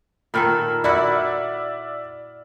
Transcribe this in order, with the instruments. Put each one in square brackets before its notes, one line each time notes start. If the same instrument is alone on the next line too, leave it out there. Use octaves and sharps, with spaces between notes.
[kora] A#2 D#3 A4 [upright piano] B5 F6
[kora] E4 F#4 [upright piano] D5 E5